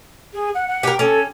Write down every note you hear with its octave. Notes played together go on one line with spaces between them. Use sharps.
G#4
F#5
F#5
G4 A#4
C#4 A4